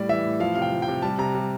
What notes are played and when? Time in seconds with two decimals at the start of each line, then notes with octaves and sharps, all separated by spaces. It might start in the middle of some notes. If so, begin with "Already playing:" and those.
Already playing: A2 G3 D5
0.09 E3 E5
0.25 A2
0.40 F3 F5
0.55 C3 F5
0.62 G5
0.72 F3
0.82 G5
0.88 C3
1.02 G3 A5
1.18 C3 A#5
1.35 G3